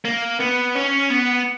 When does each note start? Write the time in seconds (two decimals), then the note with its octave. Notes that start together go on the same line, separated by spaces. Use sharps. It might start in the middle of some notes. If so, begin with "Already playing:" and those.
0.05 A#3
0.40 B3
0.75 C#4
1.10 B3